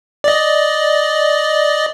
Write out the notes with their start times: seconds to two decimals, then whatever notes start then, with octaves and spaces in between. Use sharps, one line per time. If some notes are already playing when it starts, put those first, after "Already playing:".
0.24 D5 D#5